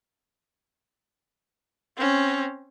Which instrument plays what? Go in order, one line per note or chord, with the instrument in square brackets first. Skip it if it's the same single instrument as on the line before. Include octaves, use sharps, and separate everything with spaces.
[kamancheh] C4 C#4